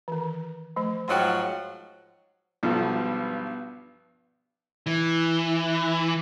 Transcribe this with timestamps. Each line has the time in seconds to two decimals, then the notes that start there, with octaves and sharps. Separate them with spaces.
0.08 D#3 E3
0.76 F3 A3
1.08 G#2 F3 F#3 G5 C6
2.63 B1 G2 B2 F3
4.86 E3